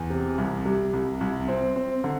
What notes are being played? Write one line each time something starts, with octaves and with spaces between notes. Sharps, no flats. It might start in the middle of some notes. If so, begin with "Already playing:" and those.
Already playing: E2
C3
C2
G3
C2
C2
C4
C4
D3